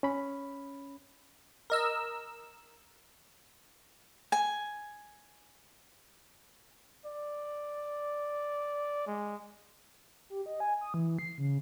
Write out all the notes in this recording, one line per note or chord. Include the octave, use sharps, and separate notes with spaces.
C#4 B5
A#4 D#5 E6
G#5
D5
G#3
G4
D#5
G#5
D#6
E3
C7
C#3